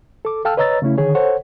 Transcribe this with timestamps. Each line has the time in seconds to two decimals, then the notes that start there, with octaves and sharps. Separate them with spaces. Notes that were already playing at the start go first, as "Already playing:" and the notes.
0.25 A4 D6
0.45 A4 F5 G5 A5 E6 F6
0.57 B4 C#5 D#5 A#5 E6 A6
0.82 C#3 A3 C#4 E4
0.98 D3 D#3 G#4 C#5
1.15 A4 C5 C#5 F#5